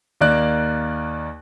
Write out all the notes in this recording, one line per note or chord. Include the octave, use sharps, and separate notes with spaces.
D#2 A#3 D5 F#6